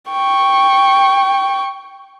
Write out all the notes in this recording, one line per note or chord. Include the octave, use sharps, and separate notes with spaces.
G5 C#6